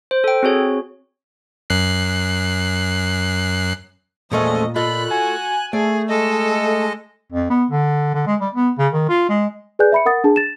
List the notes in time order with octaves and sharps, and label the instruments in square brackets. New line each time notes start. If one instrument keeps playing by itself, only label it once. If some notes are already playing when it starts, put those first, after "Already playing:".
[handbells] C5
A4 G5
C4 F#4 G#4 C#5
[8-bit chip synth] F#2 F#6 C7
[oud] E2 A3 C#4 [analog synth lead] A#2 [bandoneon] F3 G#3 [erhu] D#5
[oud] A3 F4 D#5 [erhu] B5 [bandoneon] F#6
[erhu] F#4 [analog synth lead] G#5
[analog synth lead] A3 [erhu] G#4 [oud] D5
[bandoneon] G#3 D#5 [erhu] A4
[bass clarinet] F2
B3
D3
D3
G#3
G3
B3
C#3
D#3
F4
G#3
[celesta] G#4 B4 D5 G#5 F#6 G6
E5 B5 C#7
A#4 F#5 D#6 A6
D4 G#4 A5
A6 E7